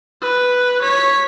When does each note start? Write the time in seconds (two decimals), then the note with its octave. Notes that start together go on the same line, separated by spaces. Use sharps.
0.21 B4
0.82 C#5 B6